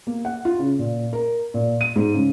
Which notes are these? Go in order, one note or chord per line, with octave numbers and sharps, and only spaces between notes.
A#3
F#5
F4
C#3
A#2
A#4
A#2
D#7
G#2
C#3